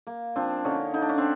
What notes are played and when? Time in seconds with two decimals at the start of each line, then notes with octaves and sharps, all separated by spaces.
0.07 A#3
0.36 F3 C4 D4
0.64 D3 C#4 D#4
0.94 D3 D#4
1.02 D4
1.09 C#4
1.18 C4 D4